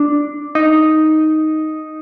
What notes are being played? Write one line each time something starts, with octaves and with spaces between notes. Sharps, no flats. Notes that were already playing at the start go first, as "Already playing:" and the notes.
Already playing: D4
D#4